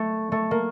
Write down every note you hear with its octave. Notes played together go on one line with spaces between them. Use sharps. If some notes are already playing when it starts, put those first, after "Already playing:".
Already playing: A3
A3
A#3